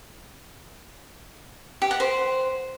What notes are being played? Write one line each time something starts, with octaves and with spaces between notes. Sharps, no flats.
G4
F#5
C5